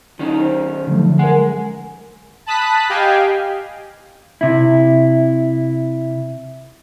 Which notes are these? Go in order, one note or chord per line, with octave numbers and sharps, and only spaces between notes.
D#3 C#4 D#4
C5
D3 F3 F#3 A3
G#3 A#4 F#5 G#5
A5 B5 D#6 F#6 B6
G4 D#5 F5 G5 G#5
C3 E4